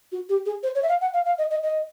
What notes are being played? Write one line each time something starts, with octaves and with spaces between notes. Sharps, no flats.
F#4
G4
G#4
C5
C#5
E5
F5
F#5
F5
F5
D#5
D#5
D#5